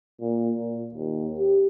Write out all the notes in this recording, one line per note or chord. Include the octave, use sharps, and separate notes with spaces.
A#2
A#2
D#2
G4